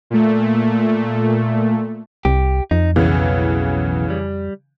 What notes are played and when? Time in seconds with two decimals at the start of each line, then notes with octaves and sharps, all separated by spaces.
0.10 A#2 A3
2.25 C2 G4
2.71 F2 D#4
2.96 B1 C#3 E3 B3
4.10 G3